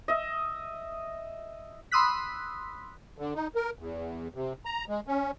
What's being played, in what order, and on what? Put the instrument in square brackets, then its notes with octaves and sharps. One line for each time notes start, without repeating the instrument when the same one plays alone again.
[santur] D#5 E5
[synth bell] B5 C6 D#6 E6 F#6 B6
[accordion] D3
D#4
A#4
E2
C3
A#5
G#3
C#4